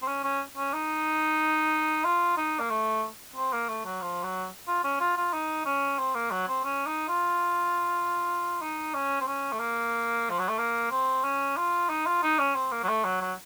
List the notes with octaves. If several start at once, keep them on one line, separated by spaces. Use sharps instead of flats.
C4
C#4
C#4
C#4
D#4
F4
D#4
A#3
A3
C4
A#3
A3
F#3
F3
F#3
F4
C#4
F4
F4
D#4
C#4
C4
A#3
F#3
C4
C#4
D#4
F4
D#4
C#4
C4
C#4
A3
A#3
F3
F#3
A3
A#3
C4
C#4
F4
D#4
F4
D#4
C#4
C4
A#3
F#3
A3
F#3
F#3